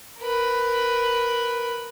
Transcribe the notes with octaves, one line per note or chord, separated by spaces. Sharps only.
A#4 B4